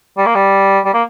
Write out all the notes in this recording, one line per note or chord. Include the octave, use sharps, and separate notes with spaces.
G3
A#3
G3
G3
A#3